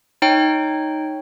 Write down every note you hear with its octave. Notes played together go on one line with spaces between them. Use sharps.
D#4 C#5 G5